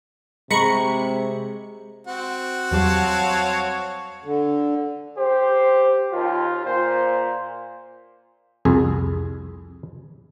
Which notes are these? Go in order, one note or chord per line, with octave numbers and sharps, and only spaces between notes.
C3 G#3 A#5 B5 C#6 C#7
C4 F#4
E2 F#3 G3 C#5 F5 A5
D3
G4 C5
D#2 F4
A#2 C5
C2 F2 G#4